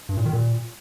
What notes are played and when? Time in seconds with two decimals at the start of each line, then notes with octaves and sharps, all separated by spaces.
0.09 G2
0.17 A#2
0.25 D#3
0.33 A#2